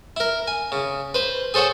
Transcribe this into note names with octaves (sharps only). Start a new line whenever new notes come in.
E4 A#4
G#5
C#3
B4 C5
G#4 A4 C5 C#5 F#5